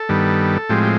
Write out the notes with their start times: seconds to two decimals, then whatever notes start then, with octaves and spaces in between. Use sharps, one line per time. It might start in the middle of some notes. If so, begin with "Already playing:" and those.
Already playing: A4
0.09 G2 D#3 G3 B3
0.69 A2 F3 G#3 C4 G4
0.83 G4